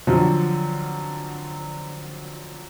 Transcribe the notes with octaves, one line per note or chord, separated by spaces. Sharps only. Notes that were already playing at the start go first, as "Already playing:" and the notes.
D3 F3 F#3 C4